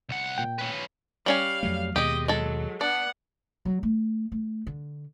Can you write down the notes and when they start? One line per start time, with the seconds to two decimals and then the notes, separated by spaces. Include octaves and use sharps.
0.09 C2 F#5
0.38 A#2 G5
0.59 C#4 B4
1.26 G3 C#4 F5 G#5
1.63 F2 F#3 A3
1.96 D#2 B2 G#3 G4 D#5
2.28 F#3 G#3 A4
2.81 B3 D4 F#5
3.65 F#3
3.83 A3
4.32 A3
4.67 D3